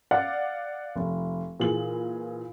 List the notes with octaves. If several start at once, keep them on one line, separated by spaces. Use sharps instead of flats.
D5 F5 F#5
F1
A#2 E3 G#4 F#7